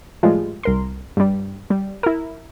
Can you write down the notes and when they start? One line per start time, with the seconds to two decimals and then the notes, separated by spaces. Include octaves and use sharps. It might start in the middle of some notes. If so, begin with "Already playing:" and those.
0.23 A2 F3 G3 G#3 F4
0.63 C2 A#4 C6
1.17 G2 G3
1.70 G3
2.03 E4 A#4